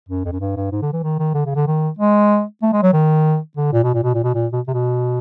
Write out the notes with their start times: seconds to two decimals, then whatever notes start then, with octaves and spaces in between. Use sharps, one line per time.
0.09 F#2
0.25 F2
0.32 F#2
0.40 G2
0.56 G2
0.72 G#2
0.82 D3
0.93 E3
1.03 D#3
1.19 D#3
1.35 D3
1.46 C#3
1.56 D3
1.67 D#3
1.98 G#3
2.62 A3
2.73 G#3
2.82 F#3
2.93 D#3
3.57 D3
3.73 A#2
3.84 B2
3.94 A#2
4.03 B2
4.14 A#2
4.24 B2
4.34 A#2
4.53 B2
4.67 C3
4.74 B2